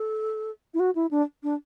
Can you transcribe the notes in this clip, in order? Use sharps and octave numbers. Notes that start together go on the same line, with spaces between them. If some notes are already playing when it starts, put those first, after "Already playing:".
Already playing: A4
E4
F#4
E4
D4
D4